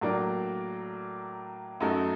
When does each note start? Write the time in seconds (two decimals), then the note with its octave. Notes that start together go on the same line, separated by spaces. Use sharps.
0.01 A2 F#3 A#3 D4
1.80 F#2 F#3 A3 D#4 A4